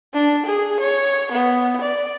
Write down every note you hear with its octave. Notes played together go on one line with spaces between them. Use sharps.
D4
G#4
C#5
B3
D5